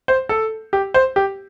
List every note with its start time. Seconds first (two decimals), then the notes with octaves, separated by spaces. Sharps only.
0.08 C5
0.29 A4
0.73 G4
0.94 C5
1.16 G4